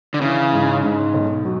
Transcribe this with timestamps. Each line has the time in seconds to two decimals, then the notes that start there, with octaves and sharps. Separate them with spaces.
0.14 D3
0.21 C#3 E3
0.53 G#2
0.83 G#2
1.14 B1
1.45 F#3